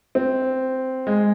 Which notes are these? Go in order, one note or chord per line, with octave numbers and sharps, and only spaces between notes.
C4
G#3